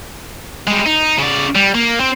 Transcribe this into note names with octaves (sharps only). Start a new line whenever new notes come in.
G3 G#3
D#4
C#3 D5
G3
A#3
C4